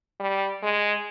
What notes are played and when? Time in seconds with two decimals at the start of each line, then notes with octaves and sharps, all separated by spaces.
0.20 G3
0.63 G#3